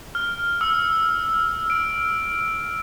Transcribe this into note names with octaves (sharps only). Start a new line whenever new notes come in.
F6
E6
D7